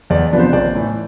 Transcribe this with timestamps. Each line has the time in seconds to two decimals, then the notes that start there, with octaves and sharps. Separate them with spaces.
0.10 E2 D5
0.32 C3 F3 B3 D4
0.39 C5
0.53 A1 D5
0.75 A2 E3